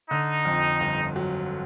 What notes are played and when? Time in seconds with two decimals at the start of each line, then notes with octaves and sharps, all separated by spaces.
0.11 D3 D#4
0.45 F2
0.80 G1
1.16 F#3